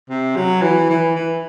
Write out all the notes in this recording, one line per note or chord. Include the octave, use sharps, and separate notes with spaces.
C3
F#3
E3
E3
E3